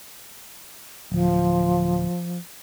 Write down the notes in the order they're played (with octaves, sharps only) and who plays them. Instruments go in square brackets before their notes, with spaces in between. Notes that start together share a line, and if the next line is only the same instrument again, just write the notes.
[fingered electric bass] D1 [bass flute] F3